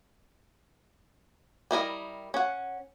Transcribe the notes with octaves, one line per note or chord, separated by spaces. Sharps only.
G3 E4 A#4 D#5
C#4 F#5